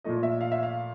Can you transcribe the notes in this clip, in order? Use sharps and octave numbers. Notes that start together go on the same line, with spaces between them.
A#2 F3 A3 D#5
E5
F5
E5
F5